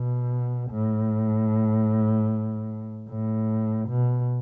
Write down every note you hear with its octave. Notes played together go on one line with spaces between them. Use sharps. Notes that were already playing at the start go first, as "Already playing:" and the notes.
Already playing: B2
A2
A2
B2